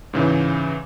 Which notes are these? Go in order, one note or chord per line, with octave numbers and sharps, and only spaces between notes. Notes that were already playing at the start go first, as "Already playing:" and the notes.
G#2 C#3 E3